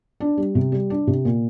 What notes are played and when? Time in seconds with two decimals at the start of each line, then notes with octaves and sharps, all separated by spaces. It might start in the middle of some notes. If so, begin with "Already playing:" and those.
0.20 D4
0.37 G3
0.55 C3
0.72 G3
0.90 D4
1.07 C3
1.25 A#2